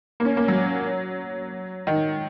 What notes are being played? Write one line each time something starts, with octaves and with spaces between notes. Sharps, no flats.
A#3
C#4
A#3
F#3
D#3